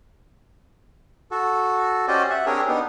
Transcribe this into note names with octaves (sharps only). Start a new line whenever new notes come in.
F#4 A4
C#4 F#4 G4 C5 D5 D#5
E5 F#5
C4 D4 G4 G#4 A#4 C#5
B3 D4 D#4